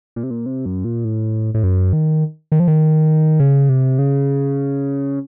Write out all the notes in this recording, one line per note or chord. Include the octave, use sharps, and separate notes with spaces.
A#2
C3
A#2
C3
F#2
A#2
A2
A2
F#2
D#3
D#3
F3
D#3
C#3
C3
C#3